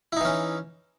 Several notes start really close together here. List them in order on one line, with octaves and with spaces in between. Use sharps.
E4 D#4 E3 C#4